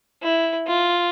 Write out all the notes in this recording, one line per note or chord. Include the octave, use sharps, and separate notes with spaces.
E4
F4